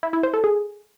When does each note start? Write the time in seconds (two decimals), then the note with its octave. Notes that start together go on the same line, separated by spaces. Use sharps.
0.03 E4
0.13 E4
0.23 C5
0.34 A4
0.44 G#4